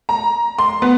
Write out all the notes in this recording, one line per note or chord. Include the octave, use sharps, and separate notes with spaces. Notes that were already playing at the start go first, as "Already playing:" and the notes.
A#5
C6
B3